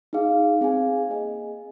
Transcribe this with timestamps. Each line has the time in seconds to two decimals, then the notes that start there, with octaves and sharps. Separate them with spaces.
0.13 D#4 G#4 F5
0.61 C4 G#4 F5 G#5
1.09 A#3 G#4 D#5 G#5